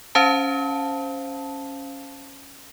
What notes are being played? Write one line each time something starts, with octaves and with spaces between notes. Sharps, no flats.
C#4 C5 F5 A5